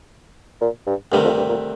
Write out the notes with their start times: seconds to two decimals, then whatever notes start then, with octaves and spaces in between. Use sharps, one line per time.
0.61 A#2
0.87 G2
1.12 D2 G2 C3 D#3 G3
1.24 F2
1.37 G2
1.49 A#2